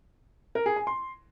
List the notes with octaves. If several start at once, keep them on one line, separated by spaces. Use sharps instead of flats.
A#4
G#4
G#5
C6